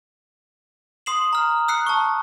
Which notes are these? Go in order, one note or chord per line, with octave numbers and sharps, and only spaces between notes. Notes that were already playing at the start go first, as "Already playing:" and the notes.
C6 D#6 C7 E7 F#7
A#5 F6
E6 F#6 C7 C#7
A5 C#6